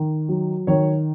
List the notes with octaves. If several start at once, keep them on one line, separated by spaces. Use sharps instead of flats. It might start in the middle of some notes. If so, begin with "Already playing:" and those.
Already playing: D#3
F#3
D#3 C#5